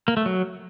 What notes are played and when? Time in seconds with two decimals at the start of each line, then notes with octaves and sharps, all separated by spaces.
0.08 A#3
0.17 A3
0.26 F#3